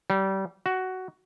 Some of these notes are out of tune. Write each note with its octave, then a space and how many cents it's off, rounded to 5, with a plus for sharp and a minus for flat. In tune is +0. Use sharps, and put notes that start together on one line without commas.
G3 -25
F#4 +10